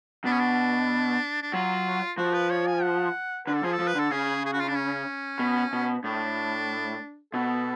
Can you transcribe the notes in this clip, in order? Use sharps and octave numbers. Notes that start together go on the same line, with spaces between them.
B2 D4
C#4
D4
D4
F#3 F4
F3 F#4
B4
C#5
G#5
F#5
D3 B4
A4
F3 G#4
A4
F3
B4
D3 A4
C#3 G#4
G#4
F#4
F4
D4
C#4
B2
B2
A2 D4
B2 A4